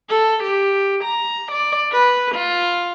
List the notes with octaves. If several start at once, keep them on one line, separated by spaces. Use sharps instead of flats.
A4
G4
A#5
D5
B4
F4